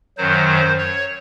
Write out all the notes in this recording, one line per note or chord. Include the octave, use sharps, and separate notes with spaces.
F#2 D#3 F#3 C5
C#5